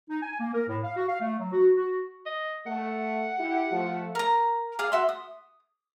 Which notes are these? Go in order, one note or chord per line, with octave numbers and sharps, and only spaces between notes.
D#4
G#5
A#3
A#4
A2
F5
F#4
F5
A3
F#3
F#4
F#4
D#5
A3 F#5
E4 G4
F3 A3
A#4 A#5
G#4 D5 F5
F#4 E5 C6
D#6